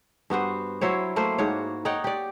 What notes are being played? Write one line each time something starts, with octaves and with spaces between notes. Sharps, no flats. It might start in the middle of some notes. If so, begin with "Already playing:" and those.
G2 B3 F#4 C5
F#3 E4 C5 C#5
A3 A#3 C5
G#2 F#4 C#5
D#4 C#5 F#5 G5
G4 D5